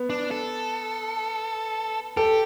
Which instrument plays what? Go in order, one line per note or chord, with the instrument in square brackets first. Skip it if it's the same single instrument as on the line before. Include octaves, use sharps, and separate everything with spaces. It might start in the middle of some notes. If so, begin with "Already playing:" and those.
Already playing: [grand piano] B3
[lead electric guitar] D4
A4
[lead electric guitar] G4 [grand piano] A4